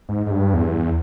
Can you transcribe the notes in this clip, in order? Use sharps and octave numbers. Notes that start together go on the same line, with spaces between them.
G#2
G#2
G2
E2